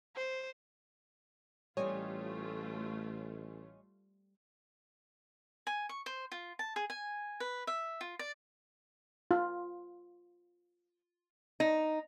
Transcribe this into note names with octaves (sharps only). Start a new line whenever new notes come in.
C5
A1 G3 A3 C4 F4 C#5 D#5 G#5
G#5
C#6
C5
F4
A5
G#4
G#5
B4
E5
F4
D5
F4
D#4